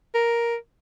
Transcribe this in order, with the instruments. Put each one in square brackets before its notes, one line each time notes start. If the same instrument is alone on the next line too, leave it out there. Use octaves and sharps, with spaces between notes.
[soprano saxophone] A#4